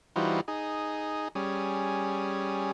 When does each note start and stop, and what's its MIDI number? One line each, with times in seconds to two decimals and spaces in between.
0.16 0.41 52
0.16 0.41 55
0.16 0.41 63
0.16 0.41 65
0.16 0.41 66
0.16 0.41 72
0.48 1.28 63
0.48 1.28 68
1.35 2.71 55
1.35 2.71 61
1.35 2.71 68